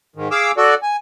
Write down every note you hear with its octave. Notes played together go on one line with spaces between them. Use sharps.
G#2 D#3
G#4 F5 D6 E6
F#4 A4 D5
G#5